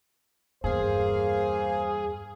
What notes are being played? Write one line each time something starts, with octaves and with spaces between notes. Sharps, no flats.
E2 G2 A#3 G#4 C5 F5